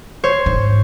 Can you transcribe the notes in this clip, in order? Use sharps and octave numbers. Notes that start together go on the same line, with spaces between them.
C5 C#5
G#2